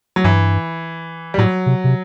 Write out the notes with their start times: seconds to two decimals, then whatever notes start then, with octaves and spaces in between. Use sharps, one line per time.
0.16 F#3
0.24 G2 E3
1.34 G3
1.38 A2 F#3
1.66 C3
1.84 C3